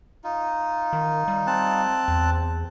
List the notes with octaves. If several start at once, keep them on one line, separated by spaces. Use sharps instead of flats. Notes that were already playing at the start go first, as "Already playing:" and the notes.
D#4 F4
D#3
G3
C4 A5 F#6
E2